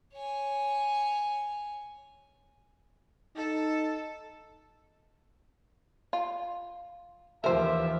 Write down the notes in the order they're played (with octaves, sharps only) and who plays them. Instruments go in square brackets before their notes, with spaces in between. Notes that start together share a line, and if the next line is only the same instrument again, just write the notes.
[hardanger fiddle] C#5 G#5
[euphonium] D#4 [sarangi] A4
[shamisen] F4
[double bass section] D#2 E3 F3 [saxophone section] G4 E5 [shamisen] A#4 C5